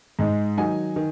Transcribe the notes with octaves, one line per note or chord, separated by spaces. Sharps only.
G#2 G#3 D#4
D#3 F#3 D#4 G#5
D#3